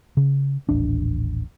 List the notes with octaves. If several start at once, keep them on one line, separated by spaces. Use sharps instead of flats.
C#3
D#1 A1 D4